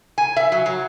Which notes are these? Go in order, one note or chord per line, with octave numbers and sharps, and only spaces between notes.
G#5
E5
F#3
F#3